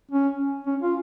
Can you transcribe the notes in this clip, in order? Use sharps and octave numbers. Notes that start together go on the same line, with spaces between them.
C#4
C#4
F4